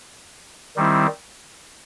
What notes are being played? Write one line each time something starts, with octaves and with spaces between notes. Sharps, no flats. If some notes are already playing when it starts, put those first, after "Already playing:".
D#3 G3 C4 E4